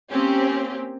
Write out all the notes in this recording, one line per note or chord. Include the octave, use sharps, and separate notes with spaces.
A#3 C4 C#4 G4